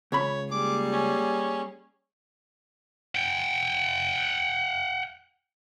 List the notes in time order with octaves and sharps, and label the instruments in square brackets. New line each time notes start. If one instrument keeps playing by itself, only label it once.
[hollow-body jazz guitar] C#2 B5 [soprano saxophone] C#5
[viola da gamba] G3 A#3 G#4 [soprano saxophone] D6
[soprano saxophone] C#4
[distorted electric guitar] F#5 G5